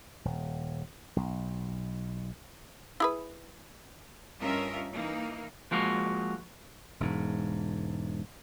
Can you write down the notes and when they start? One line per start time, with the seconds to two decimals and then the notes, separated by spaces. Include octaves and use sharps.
0.25 D#1
1.16 B1
3.00 E4 G#4 B4
4.41 G2 C#4 F4 A#4 D#5 E5
4.93 E3 A#3 D#4
5.71 F3 G#3 A#3 F#4 F5
7.00 E1 G#2